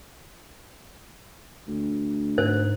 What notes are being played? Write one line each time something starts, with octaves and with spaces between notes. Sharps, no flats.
D2
G#2 C5